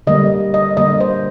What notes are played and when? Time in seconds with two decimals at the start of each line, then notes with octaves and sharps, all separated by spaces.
0.07 D3 G3 A#3 D#5
0.54 D#5
0.77 D3 G3 A#3 D#5
1.00 C5